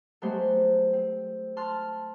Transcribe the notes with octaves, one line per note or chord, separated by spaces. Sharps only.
F#3 G#3 A3 B3 G4 C5
C4
A5 C6 F6 F#6